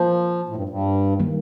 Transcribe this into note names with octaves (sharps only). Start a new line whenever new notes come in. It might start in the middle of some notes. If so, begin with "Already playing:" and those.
Already playing: F3 A#3 F4 C5
A2
G2
G2
D#3 G3 A#3